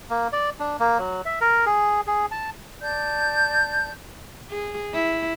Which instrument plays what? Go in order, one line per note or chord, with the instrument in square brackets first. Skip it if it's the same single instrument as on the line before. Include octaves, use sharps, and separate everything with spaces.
[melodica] A#3
D5
D4
A#3
F#3
E5
A#4
G#4
G#4
A5
[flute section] D5 A5 G6
[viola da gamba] G#4
E4